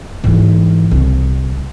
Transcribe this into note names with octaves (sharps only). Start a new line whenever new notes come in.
G#2 E3
C2